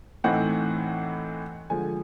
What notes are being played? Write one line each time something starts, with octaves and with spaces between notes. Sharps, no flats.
A2 E3 A3 C4 D#4 F#5
D3 F3 G#3 G#5